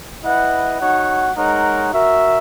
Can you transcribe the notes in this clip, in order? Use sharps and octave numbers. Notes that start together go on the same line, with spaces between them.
E4 B4 D#5 F#5
D#4 F#4 C#5 F#5
G#3 D#4 A#4 C#5 F#5
F#4 A#4 E5